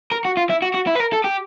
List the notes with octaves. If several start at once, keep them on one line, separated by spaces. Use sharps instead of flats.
A#4
F#4
F4
E4
F#4
F#4
E4
B4
A#4
A4
G4